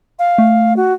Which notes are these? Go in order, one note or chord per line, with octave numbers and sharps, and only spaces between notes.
F5
A3
F#4